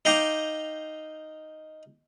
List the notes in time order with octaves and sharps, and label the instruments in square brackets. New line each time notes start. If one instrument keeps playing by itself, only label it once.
[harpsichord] D#4 F5 G5 A#5 D6